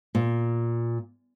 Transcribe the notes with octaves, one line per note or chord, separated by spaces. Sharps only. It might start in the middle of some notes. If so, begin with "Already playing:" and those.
A#2